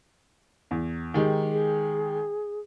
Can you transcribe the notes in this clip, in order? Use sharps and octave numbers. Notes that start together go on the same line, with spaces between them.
E2
D#3 G#3 D#4 G4
G#4